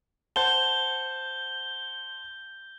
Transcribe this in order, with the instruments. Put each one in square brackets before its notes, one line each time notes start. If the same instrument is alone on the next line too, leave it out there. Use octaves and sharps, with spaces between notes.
[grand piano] C5 F#5 A5 [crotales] G6 G7